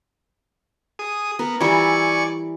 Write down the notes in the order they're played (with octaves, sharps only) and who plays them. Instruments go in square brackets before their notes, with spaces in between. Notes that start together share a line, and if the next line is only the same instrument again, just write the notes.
[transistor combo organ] G#4 D#6
[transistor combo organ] B3 [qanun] A#4
[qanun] E3 G3 E4 [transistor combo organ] D5 G#5 C#6